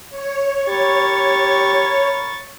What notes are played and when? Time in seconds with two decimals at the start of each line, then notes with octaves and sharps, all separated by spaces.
0.10 C#5
0.69 G4 A#4 B5 C#6 A6